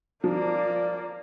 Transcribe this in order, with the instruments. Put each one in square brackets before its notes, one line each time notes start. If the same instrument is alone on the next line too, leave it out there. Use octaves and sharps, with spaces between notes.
[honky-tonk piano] F3 [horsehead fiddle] A#3 D5